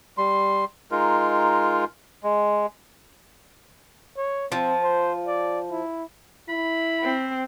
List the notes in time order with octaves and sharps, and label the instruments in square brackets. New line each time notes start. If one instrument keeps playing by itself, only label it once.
[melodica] G3 C6
G#3 D#4 F4 A#4
G#3
[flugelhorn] C#5
[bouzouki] F3 [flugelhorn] C4
[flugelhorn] C5
D5
E4
[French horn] E4 [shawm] B5
[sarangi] C4